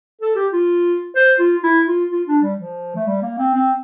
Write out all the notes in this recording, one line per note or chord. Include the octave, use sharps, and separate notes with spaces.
A4
G4
F4
C5
F4
E4
F4
F4
D4
G3
F3
A3
G3
A#3
C4
C4